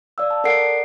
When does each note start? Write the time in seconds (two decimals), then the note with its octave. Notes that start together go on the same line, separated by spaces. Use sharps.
0.18 D5 F5 E6
0.30 A5
0.44 A4 A#4 D5 F#5 C7 D7